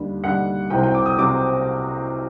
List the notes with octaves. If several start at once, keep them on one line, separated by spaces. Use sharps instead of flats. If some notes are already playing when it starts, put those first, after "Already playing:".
Already playing: D#2 D3 G3
D#2 D3 G3 F#5
C2 C3 F#3 C4 G5
G5
D6
D#6
C3 F#3 C4 D6